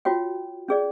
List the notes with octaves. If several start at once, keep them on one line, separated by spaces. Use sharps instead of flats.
F4 F#4 C#5 G5
C#4 G#4 D5